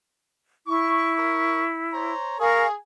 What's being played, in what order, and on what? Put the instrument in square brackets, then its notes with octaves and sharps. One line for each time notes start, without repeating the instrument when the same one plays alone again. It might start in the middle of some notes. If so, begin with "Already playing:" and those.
[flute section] E4 [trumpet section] C#6
[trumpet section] A#4 C#6
C5 C#5 A#5
[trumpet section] G#4 [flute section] A#4 F5 C#6